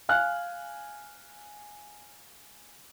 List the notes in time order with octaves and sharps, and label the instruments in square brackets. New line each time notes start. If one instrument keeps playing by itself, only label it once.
[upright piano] F5 G#5 F6 F#6